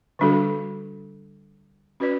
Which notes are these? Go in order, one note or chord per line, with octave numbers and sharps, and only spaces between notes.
D3 G3 D4 F#4 A4
C#4 F#4 B4 D5